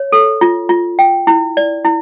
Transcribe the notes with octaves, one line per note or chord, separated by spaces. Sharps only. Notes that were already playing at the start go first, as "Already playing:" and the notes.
Already playing: C#5
A4
F4
F4
G5
E4
D5
E4